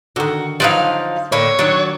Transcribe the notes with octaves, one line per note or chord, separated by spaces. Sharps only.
D3 D#3 F#4
F3 F#3 D#4 B4 D5 F5
A2 D3 A#3 C#5
A#2 D#3 F#3 D4